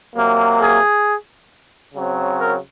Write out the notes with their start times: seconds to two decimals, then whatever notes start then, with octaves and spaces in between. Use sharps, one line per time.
0.16 C3 F#3 A#3
0.61 G#4
1.94 C#3 F#3 C4
2.39 A#4